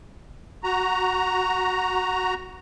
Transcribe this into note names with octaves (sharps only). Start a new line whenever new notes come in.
F#4 A#5